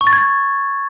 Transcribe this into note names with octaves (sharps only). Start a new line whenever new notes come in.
C#6
A6
G#6